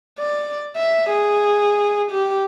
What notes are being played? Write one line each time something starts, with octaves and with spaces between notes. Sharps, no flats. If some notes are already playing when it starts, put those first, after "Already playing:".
D5
E5
G#4
G4